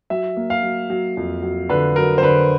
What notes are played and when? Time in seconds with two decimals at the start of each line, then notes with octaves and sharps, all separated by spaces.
0.10 F#3 E5
0.37 A#3
0.50 F5
0.63 F#3
0.90 F#3
1.17 F2
1.43 F#3
1.69 D3 B4
1.96 F#3 A#4
2.18 C5
2.23 D3 B4